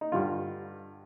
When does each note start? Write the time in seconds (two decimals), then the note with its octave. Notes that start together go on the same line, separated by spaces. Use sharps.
0.01 D#4
0.12 G2 D3 G3 F4